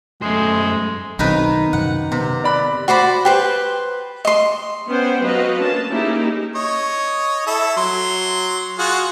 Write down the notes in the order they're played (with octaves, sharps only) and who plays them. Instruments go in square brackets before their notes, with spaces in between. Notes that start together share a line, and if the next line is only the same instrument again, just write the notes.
[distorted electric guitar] F#2 C5 [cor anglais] G#3 [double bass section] A3
[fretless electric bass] B1 C4 [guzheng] D#3 D#4 B4
[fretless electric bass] F#2 C3 [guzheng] F#5
[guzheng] C3 [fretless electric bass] B3
[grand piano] D5 B5 F#6
[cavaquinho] F#4 C5 D5 B5
G4 B4 C5
D#5 C6
[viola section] B3 C#4 C5 F#5 G5
F#3 C4 F#4 B4 D#5 F5
A#3 C#4 D4 A5
A#3 C#4 D#4 E4 G4 G#4
[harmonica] C#5 D#5
E4 A4 E5
F#3 C6
F4 F#4 G#4